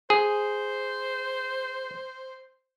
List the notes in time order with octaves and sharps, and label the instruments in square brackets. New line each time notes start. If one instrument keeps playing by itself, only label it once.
[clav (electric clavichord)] G#4 [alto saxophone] C5